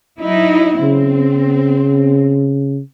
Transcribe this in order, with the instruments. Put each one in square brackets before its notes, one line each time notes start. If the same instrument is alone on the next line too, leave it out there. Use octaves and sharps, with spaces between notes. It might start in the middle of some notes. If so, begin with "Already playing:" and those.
[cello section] F#3 D#4 E4
[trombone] C#3 [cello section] C4